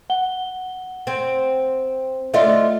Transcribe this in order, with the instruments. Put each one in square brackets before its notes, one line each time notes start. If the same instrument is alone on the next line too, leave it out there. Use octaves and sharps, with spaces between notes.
[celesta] F#5 G7
[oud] C4
[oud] A3 D4 F4 [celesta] D#5 E5